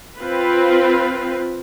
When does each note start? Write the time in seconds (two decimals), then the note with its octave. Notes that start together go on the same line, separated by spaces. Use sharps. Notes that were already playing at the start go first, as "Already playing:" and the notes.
0.18 C4 F4 B4